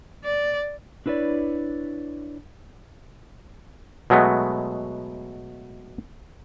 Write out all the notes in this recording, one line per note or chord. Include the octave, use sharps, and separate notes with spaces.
D5
D4 E4 B4 C#5 D5
B2 F#3 G#3 A3 B3